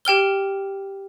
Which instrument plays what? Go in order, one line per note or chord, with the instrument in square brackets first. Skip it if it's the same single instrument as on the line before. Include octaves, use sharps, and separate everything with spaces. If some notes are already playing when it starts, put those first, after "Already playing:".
[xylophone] G4 G5 F6 G7